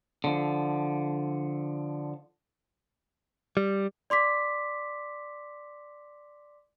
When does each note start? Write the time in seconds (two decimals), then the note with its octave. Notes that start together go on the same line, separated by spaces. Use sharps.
0.24 D3 F3
3.57 G3
4.10 D5 C6 D6 B6